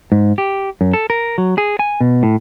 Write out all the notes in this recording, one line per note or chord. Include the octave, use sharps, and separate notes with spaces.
G#2
G4
F#2
A4
A#4
F#3
G#4
G#5
B2
A2